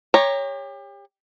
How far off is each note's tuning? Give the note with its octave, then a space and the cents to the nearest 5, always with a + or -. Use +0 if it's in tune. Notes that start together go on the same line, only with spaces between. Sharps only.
G4 +35 C#5 +0 A#5 +0